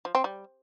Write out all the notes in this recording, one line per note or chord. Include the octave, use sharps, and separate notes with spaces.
F3
C4
G3